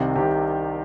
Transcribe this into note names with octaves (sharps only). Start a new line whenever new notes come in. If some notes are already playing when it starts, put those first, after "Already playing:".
Already playing: C2 C3 D#3 C4
C2 C3 D#3 G4